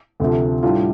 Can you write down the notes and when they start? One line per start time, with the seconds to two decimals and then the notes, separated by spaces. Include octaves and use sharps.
0.20 D2 C3 F3 A3
0.63 A2 G3 D4 F4